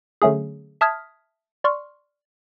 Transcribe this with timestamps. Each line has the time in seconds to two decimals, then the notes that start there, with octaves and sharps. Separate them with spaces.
0.22 D3 F#3 A3 C#4 G#4
0.81 E5 A5 D#6 F6 G#6 B6
1.64 D5 C6 C#6 F6